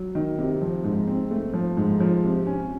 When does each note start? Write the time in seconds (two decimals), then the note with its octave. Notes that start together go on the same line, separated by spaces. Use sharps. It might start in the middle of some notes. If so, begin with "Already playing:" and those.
Already playing: F#3
0.15 D#3
0.38 C3
0.62 F3
0.84 G#2
1.07 C4
1.31 A3
1.53 F3
1.77 G#2
2.00 F3
2.23 C3
2.47 C#4